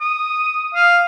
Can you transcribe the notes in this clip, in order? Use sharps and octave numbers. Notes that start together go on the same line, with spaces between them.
D#6
F5